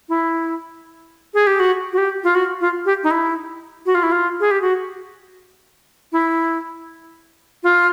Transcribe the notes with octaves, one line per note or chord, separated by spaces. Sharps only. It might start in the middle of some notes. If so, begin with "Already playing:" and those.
E4
G#4
G4
F#4
F#4
G4
F4
F#4
F4
G4
D#4
E4
F#4
F4
E4
F4
G#4
G4
F#4
E4
F4